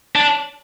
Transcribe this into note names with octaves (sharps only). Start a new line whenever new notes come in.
D4